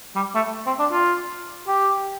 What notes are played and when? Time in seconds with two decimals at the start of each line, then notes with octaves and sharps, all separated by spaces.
0.16 G3
0.35 A3
0.66 C4
0.79 D4
0.91 F4
1.68 G4